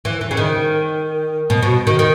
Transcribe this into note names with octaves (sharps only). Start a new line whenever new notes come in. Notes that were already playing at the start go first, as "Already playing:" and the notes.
E3
E3
C#3
D#3
B2
B2
D#3
D#3